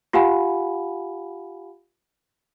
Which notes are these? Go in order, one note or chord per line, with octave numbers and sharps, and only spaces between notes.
F4 G4 F5 F#5 G#5 B5